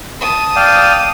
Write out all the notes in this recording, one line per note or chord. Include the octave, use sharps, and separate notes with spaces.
A5 D#6
D5 F5 G5